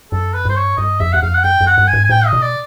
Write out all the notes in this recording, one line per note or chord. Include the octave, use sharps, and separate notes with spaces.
F#2 A4
B4
G2 C5
C#5
G2 D#5
F2 E5
E2 F#5
F2 F5
F#5
F#2 G5
F#2
F#5
G2
G#5
G#2
G#5
A2 G5
D#5
B2
D5